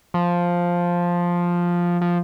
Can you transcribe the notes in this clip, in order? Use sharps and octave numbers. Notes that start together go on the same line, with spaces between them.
F3
F3